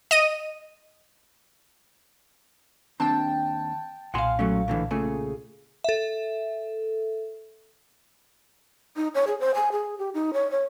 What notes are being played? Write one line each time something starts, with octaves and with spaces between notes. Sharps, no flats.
D#5 D#7
D#2 C4 D4 G5 A5
B1 A#2 F5 F#5 G#5 C6
F#3 A3 C#4
A2 D3 E3
A#2 C#3 A3 G#4
A4 E5
D#4
C#5
G#4
C5
G#5
G#4
G4
D#4
C#5
C#5